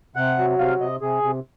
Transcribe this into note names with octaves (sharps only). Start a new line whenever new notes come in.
C3 F#5
F#3
C3 F5
C3 D#5
C3 G#4
C3